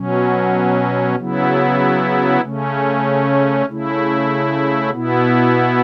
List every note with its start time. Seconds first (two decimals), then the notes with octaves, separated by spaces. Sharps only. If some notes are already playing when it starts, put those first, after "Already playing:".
Already playing: B2 F#3 C#4
1.16 C#3 F#3 B3 E4
2.41 C#3 A3 C#4
3.66 C#3 A3 E4
4.90 B2 B3 E4